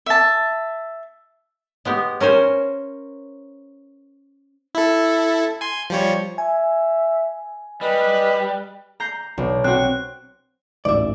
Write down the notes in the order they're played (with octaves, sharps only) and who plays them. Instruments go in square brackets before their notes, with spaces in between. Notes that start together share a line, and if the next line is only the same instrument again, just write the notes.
[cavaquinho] E5 A5
[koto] G#3 B3 G4
C#4 A#4 C5 G#5
[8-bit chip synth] E4 A4
G#5 C6
F3 G3 C#5
[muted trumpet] E5 [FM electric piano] G#5
[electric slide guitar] G3 [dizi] B4 [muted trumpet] D#5
[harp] A#5 G6 C7
B1
[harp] C4 F#4 [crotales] F#6
[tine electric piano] A1 D2 G#2 [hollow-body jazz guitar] D5 E5